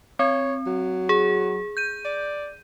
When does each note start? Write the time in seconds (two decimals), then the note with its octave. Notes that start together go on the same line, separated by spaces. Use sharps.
0.19 C4 C#5
0.66 F#3
1.09 G#4
1.77 G6 D#7
2.05 D5